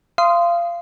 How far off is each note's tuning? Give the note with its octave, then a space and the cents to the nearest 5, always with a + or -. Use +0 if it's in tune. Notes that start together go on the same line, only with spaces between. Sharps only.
F5 -25 C6 -15 D#6 +0